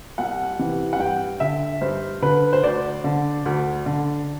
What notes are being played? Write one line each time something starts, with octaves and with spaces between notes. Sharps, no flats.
C2 F#5
C3 E3
F#5
G2 G5
D3 E5
G2 C5
D3 B4
C5
D2 D5
D3
D2
D3